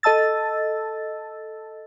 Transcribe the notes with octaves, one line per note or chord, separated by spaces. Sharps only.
A4 D#5 A5 E6 A6